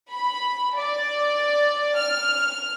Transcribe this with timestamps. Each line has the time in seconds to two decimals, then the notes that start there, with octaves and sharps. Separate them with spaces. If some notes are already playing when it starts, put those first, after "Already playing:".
0.12 B5
0.76 D5
1.98 F6